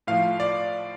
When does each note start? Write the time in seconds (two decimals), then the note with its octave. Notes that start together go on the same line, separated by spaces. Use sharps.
0.07 A2 F3 A3 F5
0.40 D5